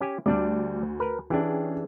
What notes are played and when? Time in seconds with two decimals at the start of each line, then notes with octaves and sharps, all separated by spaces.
0.01 C#4 G4 G#5
0.26 D2 G3 D4 D5
1.00 A#4 B4
1.30 E3 C#4 D4 G4 G#4